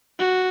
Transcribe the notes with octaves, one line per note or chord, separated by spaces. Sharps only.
F#4